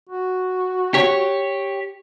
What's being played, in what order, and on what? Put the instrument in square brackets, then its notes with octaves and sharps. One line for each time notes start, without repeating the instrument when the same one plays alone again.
[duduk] F#4
[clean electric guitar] G4 C#5